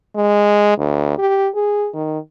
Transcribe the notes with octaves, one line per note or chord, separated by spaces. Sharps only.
G#3
D2
G4
G#4
D#3